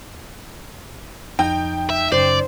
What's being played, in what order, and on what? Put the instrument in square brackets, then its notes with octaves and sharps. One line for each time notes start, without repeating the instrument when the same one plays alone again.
[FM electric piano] F2 F3 [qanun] D#4 [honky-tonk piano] G5
[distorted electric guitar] E5
[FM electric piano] F#2 C#3 C#4 [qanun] C5 [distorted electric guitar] D5